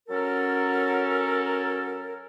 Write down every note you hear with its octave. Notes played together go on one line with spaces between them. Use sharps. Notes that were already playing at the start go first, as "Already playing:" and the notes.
F#3 C#4 A4 A#4